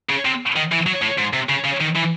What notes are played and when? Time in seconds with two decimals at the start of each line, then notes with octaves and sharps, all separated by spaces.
0.09 C#3
0.25 C3
0.56 D#3
0.72 E3
0.87 F#3
1.02 A2
1.18 G#2
1.33 C3
1.49 C#3
1.64 C#3
1.80 D#3
1.95 E3